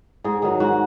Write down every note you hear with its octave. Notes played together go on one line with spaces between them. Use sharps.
G#2 G#4
D#3 F#3 G#4
G#2 F#4